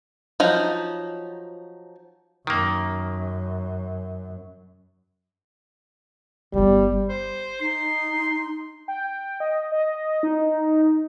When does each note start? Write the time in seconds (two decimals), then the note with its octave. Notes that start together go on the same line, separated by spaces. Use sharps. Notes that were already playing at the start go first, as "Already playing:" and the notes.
0.40 F3 F#3 D#4
2.47 F#2 D#3 A#3
6.54 D1 G1 G3
7.09 C5
7.61 D#4 C6
8.88 G5
9.40 D#5
9.72 D#5
10.23 D#4